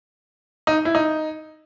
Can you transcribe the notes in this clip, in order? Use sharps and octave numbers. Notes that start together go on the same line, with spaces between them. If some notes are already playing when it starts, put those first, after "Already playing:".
D#4
E4
D#4